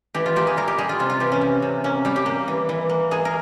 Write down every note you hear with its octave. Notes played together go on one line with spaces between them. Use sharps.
E3 G4
F4
A#3 G4
G#4
G3 A#4
G4
G3 G#4
F4
C3 F4
F4
E3 G4
C#4
C3
C3
A#3 C#4
G3 G4
G4
A#3
E3
E3
A#3
A#3 G#4
A#4